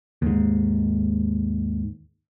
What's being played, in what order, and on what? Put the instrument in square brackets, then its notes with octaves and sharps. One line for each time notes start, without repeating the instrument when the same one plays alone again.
[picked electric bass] D#2 G#2